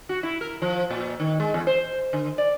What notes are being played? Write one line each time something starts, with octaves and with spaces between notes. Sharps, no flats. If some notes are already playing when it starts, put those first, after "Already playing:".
F#4
E4
A#4
F3
A#2
D#3
G#3
E2
C5
D3
D5